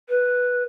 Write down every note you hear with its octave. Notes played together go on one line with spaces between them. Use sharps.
B4